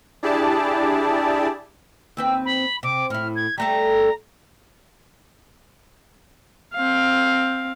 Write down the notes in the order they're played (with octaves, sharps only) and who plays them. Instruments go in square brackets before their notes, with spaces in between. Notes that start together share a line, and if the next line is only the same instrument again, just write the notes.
[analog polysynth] D4 E4 G4 G#4 D5 A5
[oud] D#2 C4 B4 [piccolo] E6
[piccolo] B5
[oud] C3 [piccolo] D6
[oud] A2 E4 [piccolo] F6
[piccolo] G#6
[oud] G3 A3 A4 [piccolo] A#5
[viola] C4 F5